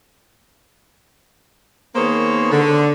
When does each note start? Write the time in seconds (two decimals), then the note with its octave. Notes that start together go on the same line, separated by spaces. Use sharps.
1.96 D#3 A#3 B3 G#4 C5 C#5
2.51 D3